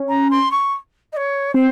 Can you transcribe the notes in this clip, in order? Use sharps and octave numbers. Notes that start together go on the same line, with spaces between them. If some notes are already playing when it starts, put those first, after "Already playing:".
Already playing: C#4
A#5
C6
C#6
D#5
C#5
C4 C5